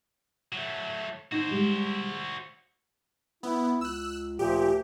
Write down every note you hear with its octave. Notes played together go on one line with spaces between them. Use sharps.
F#3 A3
D#4 F#4 C5
G3 G#3
B3 E4
C#2 E6 F#6
D2 A#2 F3 G4